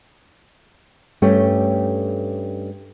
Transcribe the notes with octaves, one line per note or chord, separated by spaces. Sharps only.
G2 A3 C#4 G4